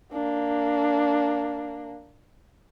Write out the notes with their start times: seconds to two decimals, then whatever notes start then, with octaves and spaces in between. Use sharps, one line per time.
0.12 A#3 D4